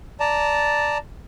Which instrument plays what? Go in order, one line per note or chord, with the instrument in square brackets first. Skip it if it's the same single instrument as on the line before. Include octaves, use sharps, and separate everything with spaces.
[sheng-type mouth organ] D5 A5 A#5